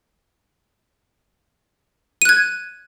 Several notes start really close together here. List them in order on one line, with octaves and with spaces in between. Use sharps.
D#7 F#6 G#6